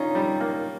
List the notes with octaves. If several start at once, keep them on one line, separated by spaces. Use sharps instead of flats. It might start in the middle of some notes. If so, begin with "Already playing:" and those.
Already playing: D3 C#4 D#4 F4
G3
A#3